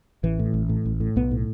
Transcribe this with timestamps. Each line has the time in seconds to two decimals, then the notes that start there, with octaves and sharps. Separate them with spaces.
0.23 A1 E3
0.39 A2
0.54 A1
0.69 A2
0.85 A1
1.00 A2
1.16 B1 B3
1.31 A2